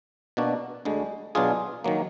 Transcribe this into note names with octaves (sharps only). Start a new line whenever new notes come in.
B2 A#3 D4 F#4
D2 D3 G#3
B2 F#3 D4 F4 G#4
D#3 F#3 A#3